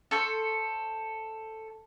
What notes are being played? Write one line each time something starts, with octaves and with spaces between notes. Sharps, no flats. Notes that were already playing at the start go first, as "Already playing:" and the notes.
A4 C5 C#6